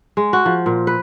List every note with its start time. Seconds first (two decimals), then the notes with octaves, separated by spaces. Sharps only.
0.17 G#3
0.33 F#4
0.46 F3
0.66 A#2
0.87 B4